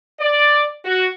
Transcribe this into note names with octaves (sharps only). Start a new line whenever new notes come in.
D5
F#4